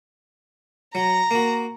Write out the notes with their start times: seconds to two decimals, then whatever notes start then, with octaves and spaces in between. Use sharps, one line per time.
0.95 F#3 A#5
1.31 A#3 F#4